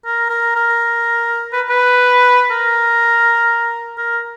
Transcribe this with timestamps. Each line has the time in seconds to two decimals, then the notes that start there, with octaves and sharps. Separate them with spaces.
0.05 A#4
0.29 A#4
0.55 A#4
1.53 B4
1.69 B4
2.51 A#4
3.98 A#4